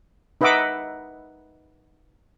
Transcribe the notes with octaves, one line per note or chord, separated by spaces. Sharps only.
D#4 B4 D#5 E5 F#5 D6